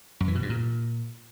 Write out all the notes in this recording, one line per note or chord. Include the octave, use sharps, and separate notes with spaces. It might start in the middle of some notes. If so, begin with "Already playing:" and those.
F#2
E3
B2
G2
A#2